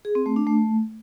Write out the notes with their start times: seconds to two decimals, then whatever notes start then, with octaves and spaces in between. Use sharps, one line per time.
0.05 G#4
0.15 C4
0.26 A3
0.36 D4
0.47 A3